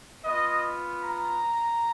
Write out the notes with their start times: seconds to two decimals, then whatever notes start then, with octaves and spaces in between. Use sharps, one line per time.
0.25 B3 F4 D#5
1.04 A#5